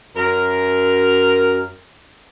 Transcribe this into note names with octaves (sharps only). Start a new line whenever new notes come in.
F#2 A#4